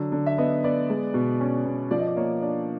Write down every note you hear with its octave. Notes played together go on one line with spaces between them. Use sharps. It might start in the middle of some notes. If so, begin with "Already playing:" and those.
Already playing: D3 F#3
D3
E5
B3 D#5
B3 D5
G#3
B2
C#4
B2
F3 D5
D#5
D5
A#3 C#5
D4 D5